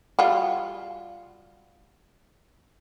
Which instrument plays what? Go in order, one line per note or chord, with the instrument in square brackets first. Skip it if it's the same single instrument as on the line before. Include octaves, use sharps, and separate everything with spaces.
[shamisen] G3 F4 F#4